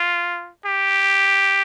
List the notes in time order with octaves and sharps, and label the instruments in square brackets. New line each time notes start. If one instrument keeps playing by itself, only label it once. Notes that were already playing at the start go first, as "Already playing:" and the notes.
Already playing: [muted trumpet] F4
G4